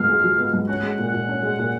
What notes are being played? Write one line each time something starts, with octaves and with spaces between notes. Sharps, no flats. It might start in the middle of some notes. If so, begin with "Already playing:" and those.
Already playing: G#2 F3 B3 F5
G#3
F3
B3
G#2
C#4 F#5
G#3
F#5
A#2
F#5
A#2
C#4
G#3
A#2